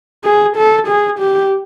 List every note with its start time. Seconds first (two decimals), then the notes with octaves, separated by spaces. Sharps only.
0.24 G#4
0.57 A4
0.88 G#4
1.19 G4